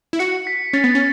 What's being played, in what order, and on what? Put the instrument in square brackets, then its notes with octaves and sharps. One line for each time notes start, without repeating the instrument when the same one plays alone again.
[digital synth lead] E4
[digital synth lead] F#4 [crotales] C#7
[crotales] B6
[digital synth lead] C#4 [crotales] A6
[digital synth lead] B3
[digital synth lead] C#4 [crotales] A6